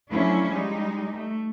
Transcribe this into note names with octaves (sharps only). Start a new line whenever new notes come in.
F3 F#3 A3 C#4 D4 E4
G3 G#3 D#4
A3